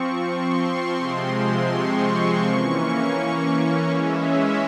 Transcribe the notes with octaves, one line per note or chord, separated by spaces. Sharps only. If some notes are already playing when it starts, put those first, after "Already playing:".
Already playing: F3 C4 C#6
C6
C3 F3 G#3 C4
C#6
E3 A#3 C#4
E3 G#3 C#4 E5
C#5